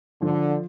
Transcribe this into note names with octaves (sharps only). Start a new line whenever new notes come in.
D3 F3